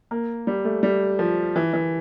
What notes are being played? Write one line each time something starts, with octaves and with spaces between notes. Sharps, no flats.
A#3
G3
A3
G3
F3
E3
E3